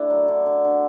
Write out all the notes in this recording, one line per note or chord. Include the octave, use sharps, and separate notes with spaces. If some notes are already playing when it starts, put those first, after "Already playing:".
Already playing: D3 A3 D4 E4
F#3
D3
D3
D3